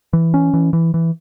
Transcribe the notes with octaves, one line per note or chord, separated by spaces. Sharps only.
E3
C#4
E3
E3
E3